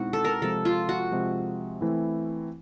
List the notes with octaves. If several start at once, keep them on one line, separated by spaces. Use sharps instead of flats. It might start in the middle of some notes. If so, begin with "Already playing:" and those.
Already playing: B2 G#3 C4 D#4 E4 F#4
A4
A#4
C3 F3 G#3 A4
F4
F#4
C3 F3 G#3
E3 A3 C4 E4